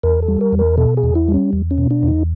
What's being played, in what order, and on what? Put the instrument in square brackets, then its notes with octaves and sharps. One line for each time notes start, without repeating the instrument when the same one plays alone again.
[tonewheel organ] E2 A#4
A4
G3
A#4
E2
A#4
B2 A4
G#4
E2
E4
G3
C#4
E2
C#4
B2
D4
E2
D#4